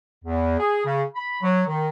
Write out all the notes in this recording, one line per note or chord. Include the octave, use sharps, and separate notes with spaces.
E2
G#4
C#3
B5
F#3
D#3